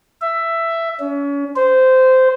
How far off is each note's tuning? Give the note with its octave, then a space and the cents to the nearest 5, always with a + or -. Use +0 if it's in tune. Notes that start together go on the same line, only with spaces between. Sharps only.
E5 +10
C#4 +35
C5 -15